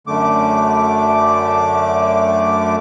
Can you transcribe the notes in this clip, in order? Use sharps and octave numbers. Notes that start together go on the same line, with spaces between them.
F#2 D3 A3 D6